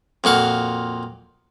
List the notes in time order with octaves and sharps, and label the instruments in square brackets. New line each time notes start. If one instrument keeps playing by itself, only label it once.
[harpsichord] F2 A#2 F#4 F5